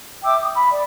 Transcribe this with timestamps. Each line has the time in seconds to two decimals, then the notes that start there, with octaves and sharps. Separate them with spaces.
0.22 E5 G5 D6 E6
0.40 D6 D#6
0.53 B5
0.69 D5